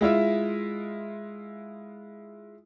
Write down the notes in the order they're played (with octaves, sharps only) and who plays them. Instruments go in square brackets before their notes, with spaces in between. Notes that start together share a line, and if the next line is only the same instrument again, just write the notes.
[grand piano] G#3 E4 F4 E5